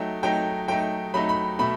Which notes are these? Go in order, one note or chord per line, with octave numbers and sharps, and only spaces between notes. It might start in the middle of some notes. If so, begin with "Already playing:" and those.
Already playing: F#3 A3 D#4 G5
F#3 A3 D#4 G5
F#3 A3 D#4 G5
F#3 A3 D#4 B5
B5
B2 A3 B5